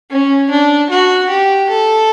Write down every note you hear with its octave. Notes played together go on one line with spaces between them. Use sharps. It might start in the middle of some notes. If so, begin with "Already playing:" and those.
C#4
D4
F#4
G4
A4